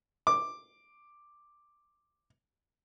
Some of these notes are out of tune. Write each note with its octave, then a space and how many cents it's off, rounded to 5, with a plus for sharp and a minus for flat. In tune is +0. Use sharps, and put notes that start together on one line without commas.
D6 +5